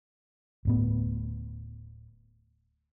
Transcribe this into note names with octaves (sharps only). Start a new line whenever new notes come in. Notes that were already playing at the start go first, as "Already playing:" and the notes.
D1 A2 B3